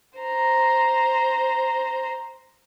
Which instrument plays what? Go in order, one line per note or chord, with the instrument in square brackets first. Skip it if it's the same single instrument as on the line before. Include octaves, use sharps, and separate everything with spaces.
[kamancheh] C5 A#5